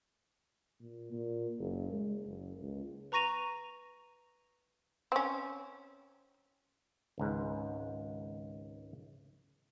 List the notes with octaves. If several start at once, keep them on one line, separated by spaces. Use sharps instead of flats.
A#2
A#2
F#1
G#3
F#1
C#2
B4 A#5 C#6 A#6 D#7 F7
C4 C#4
G#1 C#2 G#2